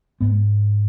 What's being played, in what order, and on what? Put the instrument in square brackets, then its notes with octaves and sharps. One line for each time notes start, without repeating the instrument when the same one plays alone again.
[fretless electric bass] G#2 G#3 B3